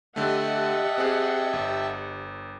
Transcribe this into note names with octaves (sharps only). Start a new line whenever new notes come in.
D3 A3 G4 D#5 E5 F#5 G5 A5
C4 G#4
G1